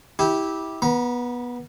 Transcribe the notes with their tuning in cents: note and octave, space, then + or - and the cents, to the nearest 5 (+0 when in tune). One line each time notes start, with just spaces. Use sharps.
E4 -25 G4 +0
B3 -15 A#5 +30